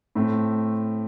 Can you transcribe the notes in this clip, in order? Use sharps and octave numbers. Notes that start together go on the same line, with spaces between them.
A2 A3 C4